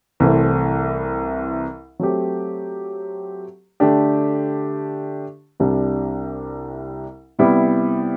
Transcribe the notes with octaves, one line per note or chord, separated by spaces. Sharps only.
C2 C3 E3 A3 C4
F#3 A3 C4 G4
D3 A3 D4 G4
C2 C3 G3 D4 G4
C3 G3 B3 E4